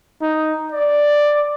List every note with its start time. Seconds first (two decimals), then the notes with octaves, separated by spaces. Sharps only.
0.22 D#4
0.72 D5